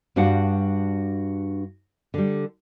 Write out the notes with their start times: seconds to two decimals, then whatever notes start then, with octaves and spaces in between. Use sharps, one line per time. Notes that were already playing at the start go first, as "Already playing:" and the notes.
0.16 G2 G3 D4 F#4 F5 F#5
2.14 D3 G3